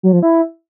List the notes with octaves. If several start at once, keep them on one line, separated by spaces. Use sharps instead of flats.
F#3
F3
E4